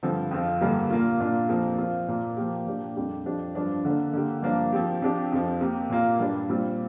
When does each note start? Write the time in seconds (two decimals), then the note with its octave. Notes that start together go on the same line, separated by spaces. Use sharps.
0.03 G2 D3 F3 C4
0.31 F2 F3 C4 F4
0.61 G2 D3 G3 A#3
0.90 A#2 A#3 F4
1.20 A#2 A#3 D4 F4
1.49 F2 C3 F3 A#3
1.78 F3 C4 F4
2.08 A#2 A#3 F4
2.37 F3 A#3 G4
2.67 A#2 A#3 D4 G4
2.97 F2 C3 G3 D4 G4
3.25 F2 F3 D4 G4
3.55 G2 F3 D4
3.85 D3 A#3 D4
4.13 D3 A#3 G4
4.43 G2 F3 A#3 D4
4.73 F3 C4 G4
5.02 C3 F3 D4 G4
5.31 F2 C3 F3
5.61 C3 A#3 G4
5.90 A#2 A#3 F4
6.20 G2 G3 D4
6.50 A#2 G3 C4 F4